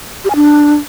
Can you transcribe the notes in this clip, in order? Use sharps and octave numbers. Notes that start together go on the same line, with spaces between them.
G4
G#5
D4